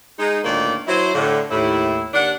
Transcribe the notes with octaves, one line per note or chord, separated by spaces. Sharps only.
G#3 D#4
D2 A#2 D#3 A#3 C#5 D5
F#3 E4 C5
A2 D3
D#2 A2 E4
D#2 D4 F#5